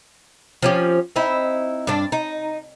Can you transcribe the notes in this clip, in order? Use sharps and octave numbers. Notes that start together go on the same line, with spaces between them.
F3 C#4 G4
C4 D#4 E4
G2 D4
D#4